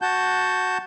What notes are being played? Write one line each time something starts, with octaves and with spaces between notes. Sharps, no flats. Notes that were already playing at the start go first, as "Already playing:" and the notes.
F#4 F#5 A5 G6